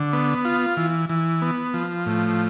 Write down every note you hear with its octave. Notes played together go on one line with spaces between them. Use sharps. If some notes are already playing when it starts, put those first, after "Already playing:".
Already playing: D3
B3
F4
E3
E3
B3
F3
A2